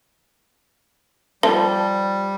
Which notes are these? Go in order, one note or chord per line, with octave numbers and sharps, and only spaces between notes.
F3 G3 A5